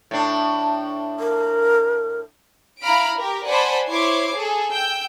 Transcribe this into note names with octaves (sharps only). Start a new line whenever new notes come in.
A2 D4
A#4
E4 F5 A#5 B5 F6 D7
G4 A#4
C5 D5 F#5 G#5 A5 B5
E4 C5 C#5 D6 G#6 C7
G#4 A4
G5 E6 G6